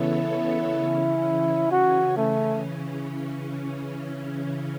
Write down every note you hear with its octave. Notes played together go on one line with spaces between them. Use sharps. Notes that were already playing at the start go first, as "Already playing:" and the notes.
Already playing: C#3 E3 B3 E4 A4 C#5
C#3 E3 C#4
F#4
A3